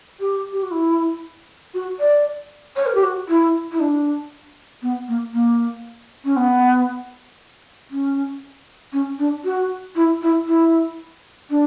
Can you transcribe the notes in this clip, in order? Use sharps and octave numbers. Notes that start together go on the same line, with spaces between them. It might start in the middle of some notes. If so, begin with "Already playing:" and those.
G4
G4
F#4
E4
F#4
D5
C#5
A#4
G4
F#4
E4
E4
D4
B3
A#3
A#3
C#4
B3
C#4
C#4
D4
F#4
E4
E4
E4
D4